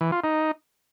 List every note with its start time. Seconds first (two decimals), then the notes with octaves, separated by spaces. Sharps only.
0.01 E3
0.12 F4
0.24 D#4